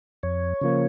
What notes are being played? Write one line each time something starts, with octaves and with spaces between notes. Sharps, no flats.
F2 C#5
C#3 F3 A#3